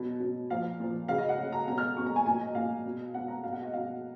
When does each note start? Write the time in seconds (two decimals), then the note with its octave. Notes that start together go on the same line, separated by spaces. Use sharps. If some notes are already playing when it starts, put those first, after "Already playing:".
Already playing: B2 F#3
0.20 B2 F#3
0.50 A#2 F3 F5
0.80 A#2 F3
1.08 C#3 F#3 F5
1.18 D#5
1.29 F#5
1.39 C#3 F#3
1.52 A#5
1.67 B2 F#3 A#5
1.78 F6
1.97 B2 F#3 C#6
2.07 A#5
2.16 G#5
2.26 A#2 F#3 G#5
2.41 D#5
2.55 A#2 F#3 F5
2.85 B2 F#3
3.14 B2 F#3 F#5
3.28 A#5
3.44 B2 F#3 F5
3.53 F#5
3.63 D#5
3.73 B2 F#3 F5